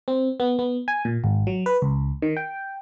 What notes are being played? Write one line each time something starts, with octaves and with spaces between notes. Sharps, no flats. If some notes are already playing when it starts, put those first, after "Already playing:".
C4
B3
B3
G#5
A#2
G#1
F#3
B4
C#2
D#3
G5